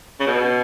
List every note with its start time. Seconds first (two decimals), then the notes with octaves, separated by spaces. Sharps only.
0.20 C#3
0.27 B2